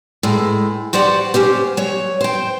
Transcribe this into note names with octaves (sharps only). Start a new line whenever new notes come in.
A2 G#3
F#4 G4 C5 D5 F#5
F#3 C#4 G4 C5
F#3 C#5
C5 G5